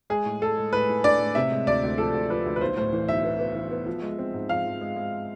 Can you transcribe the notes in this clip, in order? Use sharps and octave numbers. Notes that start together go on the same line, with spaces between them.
G#3 G#4
A2
G#3 A4
G#3
A2 B4
A2
D4 D5
A2
C3 E5
G#3
D2 D5
D2
F3 A4
D2
F3 B4
D2
B4
B1 C5
A2 C5
E3
B1 E5
B3
B3
E3
B3
F3
G#3
C4
G#2
F3 F5
F3
G#3
G#3